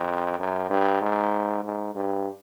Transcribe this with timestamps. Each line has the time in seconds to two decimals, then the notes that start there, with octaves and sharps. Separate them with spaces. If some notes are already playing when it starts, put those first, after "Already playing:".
Already playing: F2
0.39 F#2
0.70 G2
1.01 G#2
1.64 G#2
1.95 G2